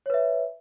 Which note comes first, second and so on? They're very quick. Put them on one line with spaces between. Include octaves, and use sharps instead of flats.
C#5 B4 E5